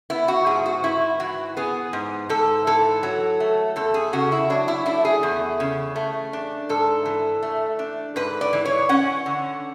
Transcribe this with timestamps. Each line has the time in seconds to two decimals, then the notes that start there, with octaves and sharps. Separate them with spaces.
0.10 B3 E4
0.28 F#4
0.46 G#2 G#4
0.66 F#4
0.84 G#2 E4
1.20 E3 F#4
1.57 B3 G#4
1.93 G#2
2.29 G#2 A4
2.67 E3 A4
3.03 F#3
3.40 A3
3.76 E2 A4
3.94 G#4
4.13 C#3 F#4
4.32 E4
4.50 F#3 D4
4.68 E4
4.86 A3 E4
5.05 G#4
5.23 E2
5.60 C#3
5.96 A3
6.33 D4
6.69 G#2 A4
7.05 E3
7.43 A3
7.79 D4
8.16 G#2 B4
8.41 D5
8.53 E3
8.65 C#5
8.89 C#4 F#5
9.26 D3